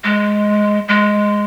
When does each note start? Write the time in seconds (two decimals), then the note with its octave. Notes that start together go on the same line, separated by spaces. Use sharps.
0.04 G#3
0.88 G#3